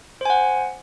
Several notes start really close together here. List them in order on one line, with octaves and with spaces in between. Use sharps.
C5 G#5 F#5